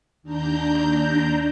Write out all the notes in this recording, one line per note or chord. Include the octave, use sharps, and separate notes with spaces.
D#2 D4 A#5 G6